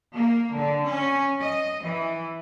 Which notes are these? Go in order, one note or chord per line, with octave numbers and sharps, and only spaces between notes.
A#3
D3
C#4
D#5
E3